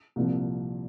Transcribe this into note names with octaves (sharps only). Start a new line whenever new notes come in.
C2 A#2 F3